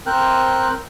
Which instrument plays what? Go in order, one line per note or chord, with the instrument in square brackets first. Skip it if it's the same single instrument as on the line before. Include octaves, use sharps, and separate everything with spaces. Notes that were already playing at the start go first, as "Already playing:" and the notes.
[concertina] C4 A#4 C5 G5 F#6